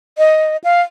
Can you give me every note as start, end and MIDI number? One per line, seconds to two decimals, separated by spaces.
0.18 0.57 75
0.64 0.81 77